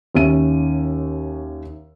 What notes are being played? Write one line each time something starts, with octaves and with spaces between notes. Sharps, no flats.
D#2 C#4 E5 D#7